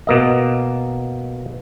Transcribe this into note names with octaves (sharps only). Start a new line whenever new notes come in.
B2 A#3 D#5